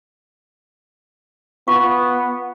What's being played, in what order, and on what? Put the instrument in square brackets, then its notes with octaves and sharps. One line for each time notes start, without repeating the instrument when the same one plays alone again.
[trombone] B3 [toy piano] F4 F5 C#6